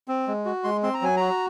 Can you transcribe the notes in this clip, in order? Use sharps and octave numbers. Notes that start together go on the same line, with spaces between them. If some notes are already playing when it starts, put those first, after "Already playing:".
C4
G#3
F#4
G#3 C6
C4 C6
A#5
F#3 G#5
F#4 A#5